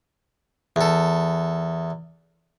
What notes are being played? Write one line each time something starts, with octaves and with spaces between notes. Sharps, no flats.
E2 A4